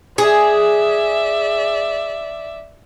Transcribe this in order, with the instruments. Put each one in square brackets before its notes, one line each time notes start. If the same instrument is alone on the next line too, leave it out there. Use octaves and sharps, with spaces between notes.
[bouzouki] G#4 [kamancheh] D5 E5